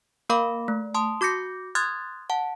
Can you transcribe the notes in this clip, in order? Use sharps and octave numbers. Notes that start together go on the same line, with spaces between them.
A#3 A#4 F5 B5 D6
A3
A5 C6 D#6
F#4 D6 G6 A#6 C#7
C6 D#6 F6 F#6 G#6 A6
F#5 A5